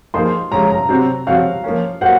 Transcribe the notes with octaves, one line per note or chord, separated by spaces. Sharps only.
F3 A#3 D#4 G#4 C5 C6
C#3 F3 G#3 C#4 A#5
A#5
C3 F#3 C4 F#4 C5
C#3 F3 C4 F#4 F5
F3 A#3 C#4
F#3 A#3 F4 C5 F#5